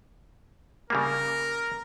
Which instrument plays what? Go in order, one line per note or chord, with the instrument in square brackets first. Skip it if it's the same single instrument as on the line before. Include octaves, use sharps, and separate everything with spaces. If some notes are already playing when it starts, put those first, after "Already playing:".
[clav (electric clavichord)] C#3 G3 A#3 [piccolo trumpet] A#4